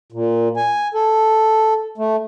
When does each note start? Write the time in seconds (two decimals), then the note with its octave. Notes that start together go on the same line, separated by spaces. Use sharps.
0.12 A#2
0.57 G#5
0.94 A4
1.98 A3